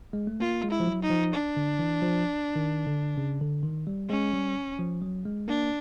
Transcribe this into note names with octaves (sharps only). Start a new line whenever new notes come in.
G#3
A3
A#3 F4
G#3
E4
F3
F#3
D#4
F3
D4
D3
E3
F3
D#3
D3
C#3
D3
D#3
G3
G#3 C#4
G3
F3
F#3
G#3
A#3 D4